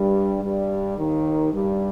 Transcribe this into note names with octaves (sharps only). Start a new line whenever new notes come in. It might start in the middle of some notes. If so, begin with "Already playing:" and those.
Already playing: G2 G3
G2 G3
D#2 D#3
G2 G3